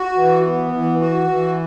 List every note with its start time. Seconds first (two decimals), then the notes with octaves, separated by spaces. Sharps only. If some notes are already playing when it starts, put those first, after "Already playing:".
Already playing: F#4
0.17 E3
0.44 B3
0.73 E3
1.00 F#4
1.28 E3